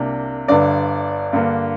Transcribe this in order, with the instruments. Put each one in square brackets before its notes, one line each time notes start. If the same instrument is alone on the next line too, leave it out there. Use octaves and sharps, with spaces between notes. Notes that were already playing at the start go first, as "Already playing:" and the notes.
Already playing: [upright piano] C2 C3 A#3 D4
G1 G2 D3 D5
G2 D3 A#3